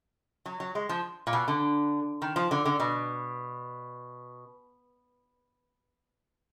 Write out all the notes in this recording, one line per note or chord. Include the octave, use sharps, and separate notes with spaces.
F#3
F#3
G#3
F3
A#2
B2
D3
D#3
F3
D3
D3
B2